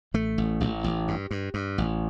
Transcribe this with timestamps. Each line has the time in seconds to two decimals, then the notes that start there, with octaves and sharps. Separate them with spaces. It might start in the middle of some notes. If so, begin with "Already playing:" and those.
0.14 A1 A3
0.38 A1
0.60 A1
0.84 A1
1.08 G2
1.31 G2
1.54 G2
1.78 A1